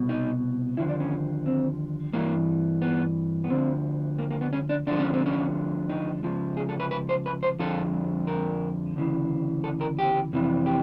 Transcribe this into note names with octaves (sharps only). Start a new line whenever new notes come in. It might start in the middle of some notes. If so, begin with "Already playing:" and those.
Already playing: C2 B2
D#4
D#2 D3 F3 E4
D4
C#4
C4
G2 E3 A#3
B3
B3
D2 D3 F3 C4
A#3
A#3
B3
C#4
D4
D2 D3 F3 D4
C#4
C4
C#4
D#4
C#2 C#3 F3
G#4
A4
B4
B4
C5
B4
C5
F2 D3 F3 A4
A#4
D2 C#3 E3
A4
A#4
G4
F2 C3 E3
G4